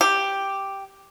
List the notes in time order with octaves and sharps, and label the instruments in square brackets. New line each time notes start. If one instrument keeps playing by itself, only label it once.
[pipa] G4